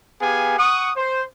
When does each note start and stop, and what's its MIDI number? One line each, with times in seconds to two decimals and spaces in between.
0.21 0.54 59
0.21 0.54 67
0.21 0.54 68
0.21 0.54 77
0.21 0.54 80
0.58 0.91 78
0.58 0.91 85
0.58 0.91 87
0.96 1.23 72